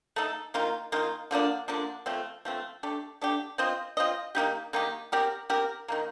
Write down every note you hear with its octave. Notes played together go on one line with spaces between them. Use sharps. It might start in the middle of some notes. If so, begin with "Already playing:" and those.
A3 D#4 A4
D#3 A#3 F4
D#3 A#3 F4
D3 F3 A#3 D4
D3 F3 A#3 D4
F3 A3 C4
F3 A3 C4
A3 D4 G4
A3 D4 G4
C4 F4 C5 D#5
C4 F4 C5 D#5
D#3 A#3 D#4 G4
D#3 A#3 D#4 G4
C4 G4 A#4
C4 G4 A#4
D#3 G3 A#3